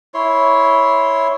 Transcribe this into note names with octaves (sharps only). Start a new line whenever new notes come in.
E4 C#5 C6